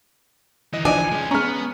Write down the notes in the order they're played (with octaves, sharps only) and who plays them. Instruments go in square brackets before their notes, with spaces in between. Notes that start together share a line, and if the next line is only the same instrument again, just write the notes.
[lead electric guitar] E3 D#4 [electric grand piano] D#5
[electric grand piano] F3 [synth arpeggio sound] D4 D5 D#5 [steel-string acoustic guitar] G#5
[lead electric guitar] G#3 C#4
[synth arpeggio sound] G#3 C#4 [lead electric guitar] B3 [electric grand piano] A#5 F6